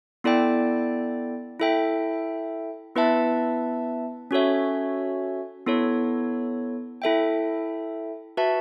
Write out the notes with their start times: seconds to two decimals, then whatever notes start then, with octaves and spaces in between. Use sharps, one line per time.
0.24 B3 E4 A4 D5 G5
1.60 E4 A4 E5 G5
2.95 B3 E4 B4 E5 A5
4.31 C#4 F#4 A4 C#5 E5
5.67 B3 E4 A4 C#5
7.02 E4 A4 E5 G5
8.37 F#4 B4 E5 A5